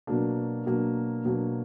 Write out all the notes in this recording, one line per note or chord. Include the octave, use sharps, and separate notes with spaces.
B2 F#3 A#3 D4
B2 F#3 A#3 D4
B2 F#3 A#3 D4